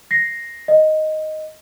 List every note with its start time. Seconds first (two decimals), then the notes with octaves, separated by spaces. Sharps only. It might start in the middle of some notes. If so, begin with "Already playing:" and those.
0.11 A#6 C7
0.68 D#5